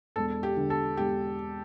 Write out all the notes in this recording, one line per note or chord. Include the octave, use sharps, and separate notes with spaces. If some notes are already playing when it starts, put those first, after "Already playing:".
E1 A4
G4
D3
A4
E1 G4